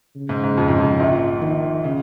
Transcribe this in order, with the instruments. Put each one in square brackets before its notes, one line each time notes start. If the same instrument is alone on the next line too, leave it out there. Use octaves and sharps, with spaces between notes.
[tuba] C#3
[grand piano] G#2
G#2
F2
G#2
F2
A#1 A#2
[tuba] D#3
[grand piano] C#3